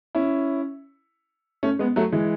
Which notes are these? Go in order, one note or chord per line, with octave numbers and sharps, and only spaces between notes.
C#4 E4
A3 C#4
G#3 B3
F#3 A3
E3 G#3